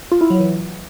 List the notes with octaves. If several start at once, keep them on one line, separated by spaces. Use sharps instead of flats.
F4
E4
F#3
E3